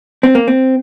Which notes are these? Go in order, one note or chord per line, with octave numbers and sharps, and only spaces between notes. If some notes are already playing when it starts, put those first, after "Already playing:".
C4
A#3
C4